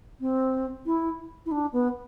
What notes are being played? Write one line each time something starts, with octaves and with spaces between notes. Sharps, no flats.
C4
E4
E4
D4
B3